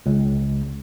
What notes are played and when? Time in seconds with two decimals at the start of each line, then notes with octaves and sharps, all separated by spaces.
0.06 C#2